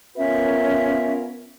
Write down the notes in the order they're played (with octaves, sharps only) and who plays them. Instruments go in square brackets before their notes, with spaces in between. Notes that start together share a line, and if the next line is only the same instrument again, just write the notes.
[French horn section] B3 F4 A#4 [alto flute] C#4 [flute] E5